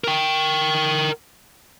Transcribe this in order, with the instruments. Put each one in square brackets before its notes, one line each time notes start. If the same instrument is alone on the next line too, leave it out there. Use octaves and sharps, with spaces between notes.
[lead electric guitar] A#4 G5